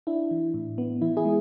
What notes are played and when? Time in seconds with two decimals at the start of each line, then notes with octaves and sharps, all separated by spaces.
0.07 D4 E4
0.31 E3
0.54 A2
0.78 B3
1.01 E3 E4
1.17 E4 G#4
1.25 G#3